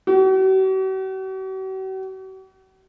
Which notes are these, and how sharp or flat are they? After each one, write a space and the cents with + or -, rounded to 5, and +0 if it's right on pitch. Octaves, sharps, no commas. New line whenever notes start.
F#4 +45